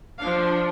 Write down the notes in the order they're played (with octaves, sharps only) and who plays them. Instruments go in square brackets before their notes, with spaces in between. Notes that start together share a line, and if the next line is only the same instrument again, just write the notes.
[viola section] F3 D4 F5